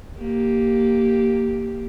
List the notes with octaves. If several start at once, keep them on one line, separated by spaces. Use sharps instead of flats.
A#3 G4